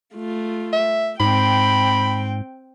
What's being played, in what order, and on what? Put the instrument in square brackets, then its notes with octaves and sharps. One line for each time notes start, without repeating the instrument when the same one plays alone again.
[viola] A3 F4
[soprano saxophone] E5
[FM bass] G#2 [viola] C4 G5 [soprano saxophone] B5